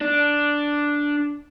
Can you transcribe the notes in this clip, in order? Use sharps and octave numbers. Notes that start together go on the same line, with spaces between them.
D4